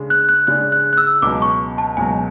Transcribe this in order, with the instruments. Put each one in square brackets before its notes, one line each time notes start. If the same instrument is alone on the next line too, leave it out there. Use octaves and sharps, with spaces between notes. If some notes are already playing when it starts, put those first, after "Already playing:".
Already playing: [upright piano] C#3 G#3 D4 G#4
[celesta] F#6
F#6
[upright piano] C#3 G#3 D4 G#4 D5 [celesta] F#6
[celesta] F#6
F#6
E6
[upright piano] C#2 B2 F#3 [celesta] D6
[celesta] C#6
A5
[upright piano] C#2 B2 F#3 [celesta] G#5